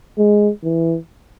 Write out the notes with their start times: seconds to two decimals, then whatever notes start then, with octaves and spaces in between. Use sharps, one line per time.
0.18 G#3
0.64 E3